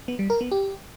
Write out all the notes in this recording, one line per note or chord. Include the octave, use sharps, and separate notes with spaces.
B3
G3
A#4
B3
G4